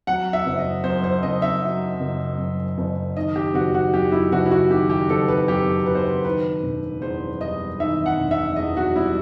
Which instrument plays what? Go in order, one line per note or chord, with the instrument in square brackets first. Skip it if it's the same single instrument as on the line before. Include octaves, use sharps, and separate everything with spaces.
[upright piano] F#3 F#5
E5
F#1
D#5
F#2 C5
C5
F#1 D#5
E5
F#3
F#1
F#2
F#1
D#3 D#5
G4
F#1 F#4
F#4
F#2 G4
E4
F#1 F#4
E4
F#4
D#3 G4
G4
F#1 A4
B4
F#2 G4
F#1 B4
C5
B4
D#3 B4
E1
E2 C5
G3 D#5
D#3 E5
F#5
E1
E5
E2 D#5
F#4
G3 E4